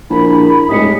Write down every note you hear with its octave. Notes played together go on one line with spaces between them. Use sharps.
A#1 E4 A#4 B5
D#1 A2 G3 G#3 D#6 B6 C#7